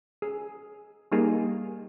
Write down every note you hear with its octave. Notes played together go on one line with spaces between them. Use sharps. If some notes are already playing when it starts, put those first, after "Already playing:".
G#4
G3 A#3 D#4 G#4